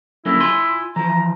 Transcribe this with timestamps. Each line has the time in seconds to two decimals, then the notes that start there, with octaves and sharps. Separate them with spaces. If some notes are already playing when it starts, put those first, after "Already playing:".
0.26 F#2 D3 A#3 E4
0.40 F4 G#5 C6
0.96 E3 F3 A#5